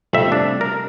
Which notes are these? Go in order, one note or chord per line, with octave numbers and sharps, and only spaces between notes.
F2 C3 G3 A3 E5
D4
A#4